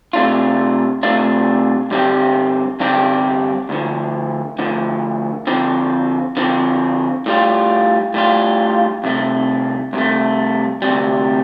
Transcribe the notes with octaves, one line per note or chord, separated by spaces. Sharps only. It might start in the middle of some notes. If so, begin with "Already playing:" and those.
C3 A3 D4 F4
C3 A3 D4 F4
G2 D3 G3 C4 G4
G2 D3 G3 C4 G4
D2 D3 F3
D2 D3 F3
D3 F3 C4
D3 F3 C4
A2 G3 F4
A2 G3 F4
C2 C3 A3
C2 C3 A3
D2 C3 G3